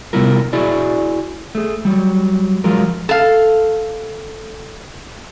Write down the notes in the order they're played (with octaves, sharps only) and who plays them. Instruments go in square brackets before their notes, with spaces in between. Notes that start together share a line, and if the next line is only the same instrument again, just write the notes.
[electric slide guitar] C3 G3 B3 E4 F4 A#4
E4 F#4 G#4 D5
A3 G#4
F#3 G3
F3 F#3 G#3 F4 A#4
[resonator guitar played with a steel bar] A4 F5